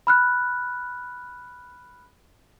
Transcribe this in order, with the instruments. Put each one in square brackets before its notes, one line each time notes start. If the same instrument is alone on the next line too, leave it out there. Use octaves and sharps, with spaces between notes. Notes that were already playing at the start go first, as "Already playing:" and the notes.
[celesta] B5 F6 F#6